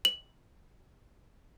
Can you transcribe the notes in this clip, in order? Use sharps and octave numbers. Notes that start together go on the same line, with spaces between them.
F#7